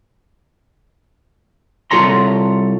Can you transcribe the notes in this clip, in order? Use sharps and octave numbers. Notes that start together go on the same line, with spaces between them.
C2 F4 A4 C#5 A#5 C6